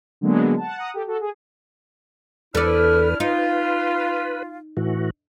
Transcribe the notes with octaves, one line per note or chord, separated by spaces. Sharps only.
D3 F#3 G#3 A#3 B3
F#5 A5
F#5 A#5 D#6
G4 A4
F#4 A4
G#4
E2 D4 E4 A4 B4 D5 F6
D#4 F4 B4
A2 E3 F#4